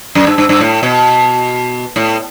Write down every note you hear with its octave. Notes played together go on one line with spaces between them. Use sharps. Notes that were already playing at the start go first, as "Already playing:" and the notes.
F#2
G2
G2
G2
A2
B2
A2